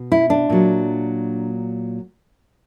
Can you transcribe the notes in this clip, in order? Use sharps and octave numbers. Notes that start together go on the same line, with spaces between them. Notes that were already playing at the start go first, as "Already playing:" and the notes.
Already playing: B2
E4
D4
A#2 F#3